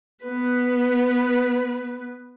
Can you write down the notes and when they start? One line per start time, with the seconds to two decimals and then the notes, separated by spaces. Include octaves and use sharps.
0.25 B3 B4